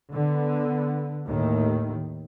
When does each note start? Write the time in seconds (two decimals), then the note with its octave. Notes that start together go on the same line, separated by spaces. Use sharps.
0.12 D3 B3
1.28 D#2 A2 D#3